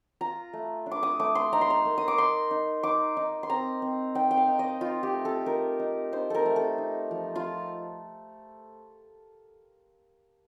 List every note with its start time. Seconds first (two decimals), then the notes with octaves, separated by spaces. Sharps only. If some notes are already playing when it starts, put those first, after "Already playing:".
0.21 F4 A#5
0.53 A3
0.86 D4
0.91 D6
1.03 D#6
1.19 A3 D6
1.35 C6
1.52 D#4 A#5
1.61 C6
1.70 A#5
1.85 A#3
1.98 D#6
2.08 D6
2.18 D#4 C6
2.51 D#4
2.83 D#4 D6
3.17 D#4
3.43 C6
3.50 C4 A#5
3.82 C4
4.15 D#4 G5
4.31 G5
4.37 F5
4.48 D#4
4.59 D#5
4.81 D#4 F4
5.03 G4
5.14 A3
5.25 A4
5.46 D#4 A#4
5.80 D#4
6.12 D#4 C5
6.30 A4 A#4
6.46 A3
6.56 A4
6.78 D#4
7.11 F3
7.35 F4